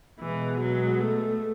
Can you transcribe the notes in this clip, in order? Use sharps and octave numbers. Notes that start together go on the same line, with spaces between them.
B2 E3 G#3 B3
F#3
A3